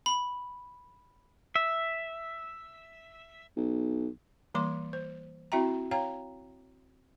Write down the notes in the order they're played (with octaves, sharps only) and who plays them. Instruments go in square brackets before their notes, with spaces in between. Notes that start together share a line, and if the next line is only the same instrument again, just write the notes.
[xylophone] B5
[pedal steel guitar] E5
[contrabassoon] B1
[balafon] E3 G3 A#3 C6 D6
C5
C4 E4 F#4 E5 G5 A#5
C#5 F5 G5 A#5